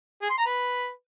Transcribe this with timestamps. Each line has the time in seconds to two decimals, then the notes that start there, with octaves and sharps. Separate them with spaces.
0.22 G#4
0.30 C6
0.38 A#5
0.46 B4